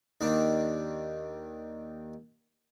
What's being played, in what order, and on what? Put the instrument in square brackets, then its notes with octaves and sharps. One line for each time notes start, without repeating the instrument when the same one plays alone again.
[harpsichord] D#2 D#3 D4